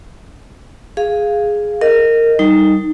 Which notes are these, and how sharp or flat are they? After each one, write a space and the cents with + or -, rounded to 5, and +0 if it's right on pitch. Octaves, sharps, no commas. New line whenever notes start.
G#4 +0 F5 +0
A#4 -20 D#5 -5
G3 -10 D#4 +0